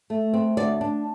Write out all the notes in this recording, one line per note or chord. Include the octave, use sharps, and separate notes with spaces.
A3
C4
D2 D5
D4